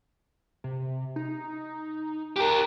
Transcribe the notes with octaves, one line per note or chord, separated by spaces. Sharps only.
C3
D#4
G4 A#4 F#6